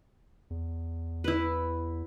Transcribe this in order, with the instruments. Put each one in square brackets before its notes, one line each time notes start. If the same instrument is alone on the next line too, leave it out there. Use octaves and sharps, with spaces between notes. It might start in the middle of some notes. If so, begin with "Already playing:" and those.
[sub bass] E2
[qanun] E4 B4